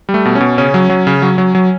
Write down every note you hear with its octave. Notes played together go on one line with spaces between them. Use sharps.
G3
A3
B2
C#4
B2
C#3 C#4
F#3
F#3
C#3
F#3
F#3
F#3